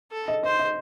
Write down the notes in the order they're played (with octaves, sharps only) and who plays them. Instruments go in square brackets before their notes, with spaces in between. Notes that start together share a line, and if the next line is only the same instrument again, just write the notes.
[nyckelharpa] A4
[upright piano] D#5
[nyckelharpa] C5 [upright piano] D#5
[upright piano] D#5